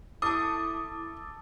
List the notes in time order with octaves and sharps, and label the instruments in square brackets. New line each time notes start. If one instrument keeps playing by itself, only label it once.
[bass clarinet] E4 [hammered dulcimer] A4 [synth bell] A5 D6 [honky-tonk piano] D#6